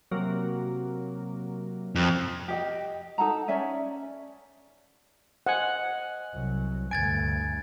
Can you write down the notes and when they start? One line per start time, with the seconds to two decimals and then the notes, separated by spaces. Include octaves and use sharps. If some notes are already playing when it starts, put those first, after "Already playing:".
0.11 C3 F#3 A#3
1.95 F2
2.48 G4 D#5 G5
3.18 D#4 A4 F#5 A#5
3.48 C#4 D5 E5 G#5
5.47 C5 D#5 F#5 G#5 F#6
6.34 C2 F#3
6.91 D2 G2 G#5 G#6 A6 D7